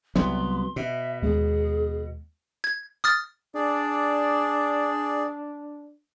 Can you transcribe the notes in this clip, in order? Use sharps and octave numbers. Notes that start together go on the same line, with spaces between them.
C2 F#3 B3 C6
B2 E5
D#2 G#3 B3 G#4
G#6
D#6 F6 A6
D4 G#4 D5